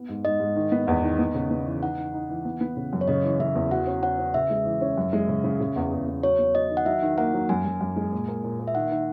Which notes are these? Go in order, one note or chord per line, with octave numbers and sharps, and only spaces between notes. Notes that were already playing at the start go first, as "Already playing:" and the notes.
Already playing: B3
G#2
G#2 D#5
G#2
D#3
B3
E2
D#3
B3
C#3
B3
E3
D#4 F#5
D#4
D#4
E3
B3
B3
C#3
F#2
C#5
C#3 D#5
E3
C#3 E5
E2
F#4 F#5
C#4
C#4 F#5
C#4
C#3 E5
G#3
E3
C#4
F#2
G#3
C#3
C#3
C#3
E2
E2
E2
F#3 C#5
B3
F#3 D#5
D#3
F#5
F#3 E5
D#3
A#3 F#5
F#3
F#2 G#5
F#2
F#2
G#3
A#2
A#3
A#2
A#3
E5
D#3 F#5
D#3